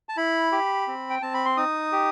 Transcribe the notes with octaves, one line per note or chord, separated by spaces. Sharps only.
A5
E4 B5
G4
C4
G5
C4 A5
B5
C6
D#4 D#6
G4